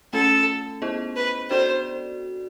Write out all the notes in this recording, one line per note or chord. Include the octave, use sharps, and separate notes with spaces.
A3 C#4 F4 A4
B3 E4 G#4 C5 D#5
B4
D4 F#4 A4 C5 D5